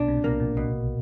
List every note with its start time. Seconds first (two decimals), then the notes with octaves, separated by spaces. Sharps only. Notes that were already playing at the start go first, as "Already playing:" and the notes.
Already playing: B1 B2 D4
0.08 C2 C3
0.17 A#2
0.24 B1 B2 A#3
0.40 A#1 A#2
0.57 B2